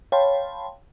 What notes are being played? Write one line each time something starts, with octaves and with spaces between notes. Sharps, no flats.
C#5 F5 G5 A5 B5 C6